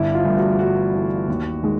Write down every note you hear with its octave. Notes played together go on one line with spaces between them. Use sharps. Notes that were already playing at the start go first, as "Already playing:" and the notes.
Already playing: G1 E4
F4
G2 E3 A3
F#4
G1 F#4
G2 E3 A3
D#2
D#3 G#3